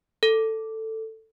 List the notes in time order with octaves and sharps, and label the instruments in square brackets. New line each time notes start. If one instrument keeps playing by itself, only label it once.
[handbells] A4